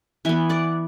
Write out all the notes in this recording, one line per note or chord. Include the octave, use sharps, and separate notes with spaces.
E3 B3 E5 G#5
D5 F#5